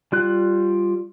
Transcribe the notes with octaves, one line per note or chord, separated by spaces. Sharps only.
G3 F4 F#6